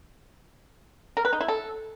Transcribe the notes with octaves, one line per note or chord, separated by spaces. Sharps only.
A#4
B4
D#4
E4
A4